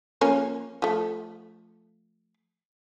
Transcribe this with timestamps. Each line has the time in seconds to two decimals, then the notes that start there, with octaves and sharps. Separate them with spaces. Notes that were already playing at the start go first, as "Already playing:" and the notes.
0.21 F3 A#3 C#4
0.82 F3 A3